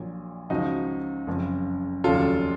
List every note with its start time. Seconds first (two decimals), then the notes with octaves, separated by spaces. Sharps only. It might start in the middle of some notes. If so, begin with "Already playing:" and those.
Already playing: A#1 A#2 F#3
0.50 C#2 C#3 F3 D#4 F#4
1.27 F#1 F2 C#3
2.04 F1 D#2 C#3 F#3 F4 A4